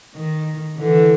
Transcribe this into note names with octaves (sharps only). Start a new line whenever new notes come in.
D#3
D3 E3